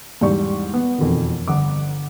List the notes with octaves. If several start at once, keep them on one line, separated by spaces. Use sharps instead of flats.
E2 G#2 G3 G4 D5 C#6
B3
E1 F2 B2 D#3
G1 F#5 D6